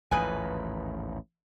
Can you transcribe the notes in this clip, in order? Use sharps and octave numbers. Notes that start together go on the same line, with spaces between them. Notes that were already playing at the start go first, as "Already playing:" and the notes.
A1 D#2 G#2 F3 B4 G#5